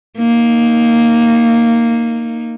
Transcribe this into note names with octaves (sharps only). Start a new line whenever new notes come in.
A#3 D#4